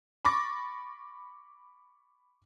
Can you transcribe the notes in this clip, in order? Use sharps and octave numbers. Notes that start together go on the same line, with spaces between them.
B5 C#6 D6 A6 A#6